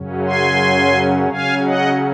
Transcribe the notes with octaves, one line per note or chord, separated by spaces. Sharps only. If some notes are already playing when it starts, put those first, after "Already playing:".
Already playing: F#2 C#3 F#3 C#4
G#5 C6
C#3 F#3 C#4 F5 G#5
D#5 F#5